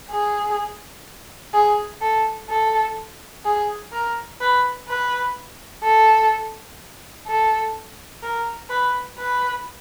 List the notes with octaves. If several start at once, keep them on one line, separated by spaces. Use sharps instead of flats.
G#4
G#4
A4
A4
G#4
A#4
B4
B4
A4
A4
A#4
B4
B4